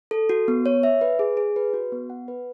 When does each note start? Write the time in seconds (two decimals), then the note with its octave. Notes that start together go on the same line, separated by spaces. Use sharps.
0.11 A4
0.29 F#4
0.48 B3
0.66 C#5
0.83 E5
1.01 B4
1.19 G#4
1.37 G#4
1.56 B4
1.74 F#4
1.92 B3
2.10 F#5
2.28 B4